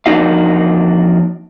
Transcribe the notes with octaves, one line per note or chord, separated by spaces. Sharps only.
F2 A#3 D4 D#4 F#4 F5